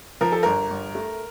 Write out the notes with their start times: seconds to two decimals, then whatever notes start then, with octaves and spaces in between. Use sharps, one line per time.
0.21 F3 A#4
0.32 A4
0.43 G1 A#4
0.70 G1
0.95 A3